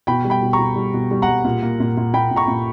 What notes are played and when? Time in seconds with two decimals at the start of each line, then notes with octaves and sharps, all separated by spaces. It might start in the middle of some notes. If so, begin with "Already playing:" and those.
0.07 B2 G5 B5
0.25 G3
0.30 G5 B5
0.42 B2
0.53 A#5 C#6
0.59 B2
0.76 G3
0.94 B2
1.11 G3
1.22 F#5 A#5
1.28 G3
1.45 A#2
1.63 A#3
1.80 A#2
1.97 A#2
2.13 A#2 G5 B5
2.31 A#2
2.36 A#5 C#6
2.48 A#2